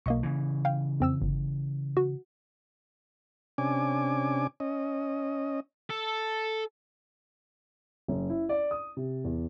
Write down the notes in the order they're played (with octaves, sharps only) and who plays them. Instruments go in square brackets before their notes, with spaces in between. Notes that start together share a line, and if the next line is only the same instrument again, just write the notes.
[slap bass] B1 [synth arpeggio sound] A#3 D#5 C#6
[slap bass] C#3 E3
[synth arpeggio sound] F5 G5
F2 C4 E6
G1
F#4
[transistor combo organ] C3 C#4 D4 G#5 D6
C#4 D#5
[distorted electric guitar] A4
[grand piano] F#1
E4
D5
D#6
C3
E2